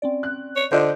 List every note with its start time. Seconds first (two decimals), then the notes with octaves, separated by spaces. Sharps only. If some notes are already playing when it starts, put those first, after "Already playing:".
0.02 C4 C#4 D5
0.23 F#6
0.56 C#5
0.72 D3 F4 C5 D5 D#5 A5 G6